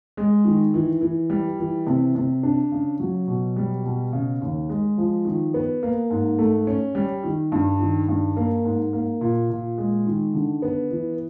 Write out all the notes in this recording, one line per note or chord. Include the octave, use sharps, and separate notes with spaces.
G#3
D#3
E3
E3
G3
E3
C3
C3
D4
C#3
F#3
B2
G3
B2
C#3
D#2
G#3
F3
D#3
B3
A#3
G#2
A3
C#4
G3
D#3
G2
D#3
G2
A#3
G#2
A#3
A#2
A#2
G#3
D#3
D3
B3
E3